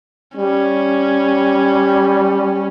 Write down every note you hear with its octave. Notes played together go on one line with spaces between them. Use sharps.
G3 C#4